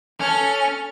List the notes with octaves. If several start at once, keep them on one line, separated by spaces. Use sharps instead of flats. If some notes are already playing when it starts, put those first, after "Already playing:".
C#4 A4 F6